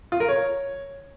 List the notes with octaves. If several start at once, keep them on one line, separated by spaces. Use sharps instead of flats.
F4
A#4
C#5